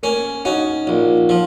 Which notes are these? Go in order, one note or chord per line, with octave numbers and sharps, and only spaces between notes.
A#3 C#4
C#4 D#4 F#4
A#1
F3